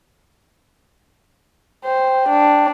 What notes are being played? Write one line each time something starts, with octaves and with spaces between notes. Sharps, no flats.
C5 G5
D4